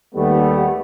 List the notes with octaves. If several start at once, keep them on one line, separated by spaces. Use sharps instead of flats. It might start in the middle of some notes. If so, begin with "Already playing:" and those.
D#2 G3 A3 B3